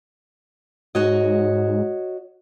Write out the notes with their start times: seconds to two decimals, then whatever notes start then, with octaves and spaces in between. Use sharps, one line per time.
0.95 G#2 F#4 C#5 D#5